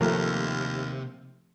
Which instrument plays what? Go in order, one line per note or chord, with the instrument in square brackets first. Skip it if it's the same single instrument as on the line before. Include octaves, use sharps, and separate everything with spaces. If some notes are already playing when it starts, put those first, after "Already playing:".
[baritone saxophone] D#2 [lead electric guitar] C3 [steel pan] F3 A3 A#4